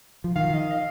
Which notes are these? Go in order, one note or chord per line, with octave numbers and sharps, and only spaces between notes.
F3
D#3 F5
D#5
F5